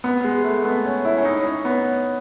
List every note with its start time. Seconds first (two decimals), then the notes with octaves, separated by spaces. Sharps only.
0.04 B3
0.24 G#3
0.44 A3
0.65 B3
0.85 C#4
1.05 E4
1.18 C#4
1.25 D#4
1.45 C#4
1.65 B3